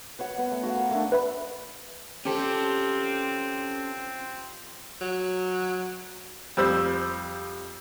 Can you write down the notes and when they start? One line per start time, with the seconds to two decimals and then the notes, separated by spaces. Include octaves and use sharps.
0.19 B4 C#5 F#5
0.38 B3
0.51 A3
0.63 F#4 C#5 F5
0.76 A#4
0.91 A3 D4
1.12 B4 E5 B5
2.25 F3 C4 C#4 G4 A4
5.01 F#3
6.57 F2 G3 C5 E6